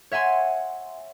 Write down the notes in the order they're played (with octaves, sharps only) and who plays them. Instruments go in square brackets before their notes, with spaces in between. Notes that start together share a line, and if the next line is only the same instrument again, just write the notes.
[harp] C#5 E5 F#5 G#5 C6